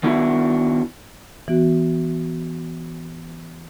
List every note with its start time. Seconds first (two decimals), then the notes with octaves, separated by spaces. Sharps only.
0.03 D#3 B3 D4 E4 F#4 E5
1.48 E3 B3 F#4